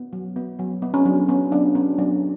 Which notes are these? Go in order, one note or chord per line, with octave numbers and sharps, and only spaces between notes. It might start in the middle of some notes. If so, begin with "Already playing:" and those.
Already playing: B3
F#3
B3
F#3
B3
C#4
F#3 D4
B3 C#4
F#3 D4
B3 C#4
F#3 D4